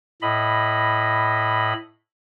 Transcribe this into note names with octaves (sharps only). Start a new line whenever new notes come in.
A2 D#5 B5